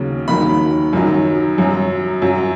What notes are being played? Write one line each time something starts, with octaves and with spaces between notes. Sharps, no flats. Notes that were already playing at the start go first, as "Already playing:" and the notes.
Already playing: D#2 C#3 F#3
D#2 D#3 F#3 B5
F#2 D#3 F#3
F#2 F#3
F#2 F#3